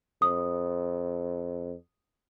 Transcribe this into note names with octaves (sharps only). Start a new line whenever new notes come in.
F2 D#6